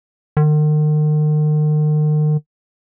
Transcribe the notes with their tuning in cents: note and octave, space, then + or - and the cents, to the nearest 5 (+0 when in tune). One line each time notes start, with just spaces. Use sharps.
D#3 -40